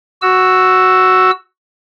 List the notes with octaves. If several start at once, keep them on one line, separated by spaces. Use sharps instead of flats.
F#4 E6